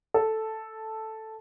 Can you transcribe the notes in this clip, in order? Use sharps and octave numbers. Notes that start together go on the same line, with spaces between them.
A4